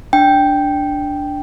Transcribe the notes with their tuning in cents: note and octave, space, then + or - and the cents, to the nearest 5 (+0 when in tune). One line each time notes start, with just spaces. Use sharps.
D4 -5 G5 +0